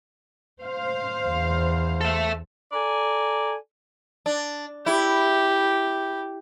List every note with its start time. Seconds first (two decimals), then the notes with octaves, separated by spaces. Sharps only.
0.61 C5 F5
1.27 E2
2.01 A4 E5
2.73 A4 D5 G#5 A#5
4.26 D4
4.86 E4 G4